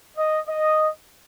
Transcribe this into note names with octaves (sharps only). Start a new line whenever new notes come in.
D#5
D#5